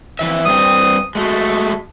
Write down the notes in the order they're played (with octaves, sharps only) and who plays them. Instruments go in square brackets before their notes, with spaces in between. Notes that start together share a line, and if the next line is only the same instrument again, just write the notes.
[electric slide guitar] F2 E3 E5
[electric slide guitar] G2 C4 [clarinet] D#6
[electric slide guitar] G#3 A3 [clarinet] F#4